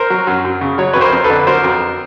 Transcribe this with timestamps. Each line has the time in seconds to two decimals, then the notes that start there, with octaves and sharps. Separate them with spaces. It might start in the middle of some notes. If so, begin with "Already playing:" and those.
Already playing: A#4 C5
0.10 F#3
0.27 F#2
0.45 F#2
0.61 C#3
0.78 F#3 C#5
0.93 F2 B4 C#5
1.01 A#4 C5
1.13 F2
1.24 A4 B4
1.30 D3
1.47 F#3 A#4 C5
1.64 F2